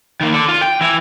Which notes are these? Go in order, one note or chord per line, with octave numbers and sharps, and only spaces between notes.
D#3 A#3
A4 D5
F4
G5
E3 E4